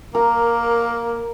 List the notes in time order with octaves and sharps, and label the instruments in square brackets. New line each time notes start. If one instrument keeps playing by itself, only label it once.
[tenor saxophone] A#3 [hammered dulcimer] A#4